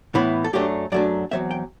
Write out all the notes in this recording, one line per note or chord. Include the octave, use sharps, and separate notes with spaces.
A2 E3 B3 E4
A4
F#2 F#3 A3 D4 G4
F#2 F#3 A3 D4 D5
E2 B2 F#3 C4 E5
G5